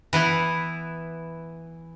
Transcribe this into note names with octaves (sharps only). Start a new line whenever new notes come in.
E3 B3 E4